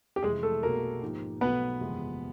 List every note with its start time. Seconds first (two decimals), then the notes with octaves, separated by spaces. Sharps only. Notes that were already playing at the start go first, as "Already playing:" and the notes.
0.16 G4
0.23 F2 C3 E3 G3 G#3 G#4
0.43 A3 A4
0.63 B1 B2 F#3 A#3 B3 A#4
1.02 G#2 F3 A#3 D#4 G4
1.41 B1 B2 F#3 A3 B3 B4
1.81 F#1 E2 C3 F3 G#3